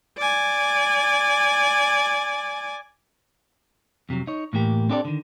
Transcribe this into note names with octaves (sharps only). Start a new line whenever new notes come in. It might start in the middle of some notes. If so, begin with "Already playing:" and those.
D5 G#5
F2 C3 D#3 F#3
D#4 C#5
A2 E3 A#3 G4
C4 D4 G4 A4 A#4 D5
D3 D#3